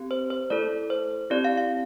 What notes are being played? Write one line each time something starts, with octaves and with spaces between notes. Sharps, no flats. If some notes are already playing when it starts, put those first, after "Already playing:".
Already playing: C4 G4
C5
C5
A3 E4 A4 D5
C5
C4 E4 G4 D5
F5
F5